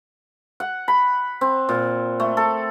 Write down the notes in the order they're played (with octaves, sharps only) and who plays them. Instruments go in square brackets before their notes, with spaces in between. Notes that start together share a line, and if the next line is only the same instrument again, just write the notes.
[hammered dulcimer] F#5
B5
C4
A#2
A3
A4